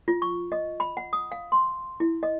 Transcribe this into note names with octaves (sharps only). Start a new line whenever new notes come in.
F4
C#6
D#5
B5
F#5
D#6
F5
C6
E4
D#5